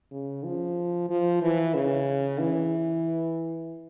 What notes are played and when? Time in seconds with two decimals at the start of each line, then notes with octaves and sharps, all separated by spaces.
0.12 C#3
0.44 F3
1.10 F3
1.42 E3
1.75 C#3
2.40 E3